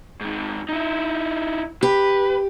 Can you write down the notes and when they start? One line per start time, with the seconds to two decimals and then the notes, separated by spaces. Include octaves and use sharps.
0.21 G#2 D#3
0.69 D#4 E4
1.83 G4 B4